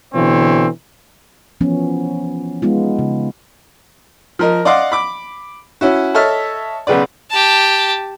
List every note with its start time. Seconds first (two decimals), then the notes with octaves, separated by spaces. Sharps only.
0.15 B2 D3 E3 C4 C#5
1.61 E3 F3 B3 C#4
2.62 G#3 B3 D#4 F4
2.99 C#3
4.39 F3 A#4 D#5
4.65 D5 D#5 F5 F#5 C6 D6
4.92 B5 D6
5.81 C#4 E4 F#4
6.14 A4 C#5 D#5 E5 A5 F6
6.87 B1 C#3 B4 D5
7.30 G4 A5